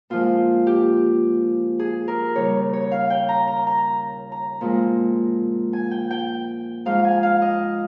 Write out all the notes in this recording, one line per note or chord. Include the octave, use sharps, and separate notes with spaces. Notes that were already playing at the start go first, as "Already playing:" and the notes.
A#2 F3 G#3 F4
G4
G#4
A#4
D#2 C#3 G3 C#5
C#5
F5
G5
A#5
A#5
A#5
A#5
A#2 F3 G#3
G#5
G5
G5
G#2 F3 G#3 F5
G#5
F5
D#5